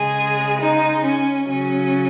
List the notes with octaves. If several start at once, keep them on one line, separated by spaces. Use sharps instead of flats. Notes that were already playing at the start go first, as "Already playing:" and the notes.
Already playing: C#3 G#3 G#4
D#4
C#4
C#3 F#3 C#4